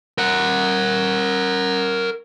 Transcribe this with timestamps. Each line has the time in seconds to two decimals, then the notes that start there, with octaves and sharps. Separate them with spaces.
0.18 A#4 F#5